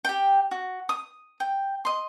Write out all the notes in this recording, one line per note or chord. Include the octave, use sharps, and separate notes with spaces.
G4 G5
F#4
D#6
G5
D#5 C6